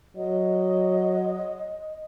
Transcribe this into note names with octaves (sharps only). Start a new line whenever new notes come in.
F#3 D#5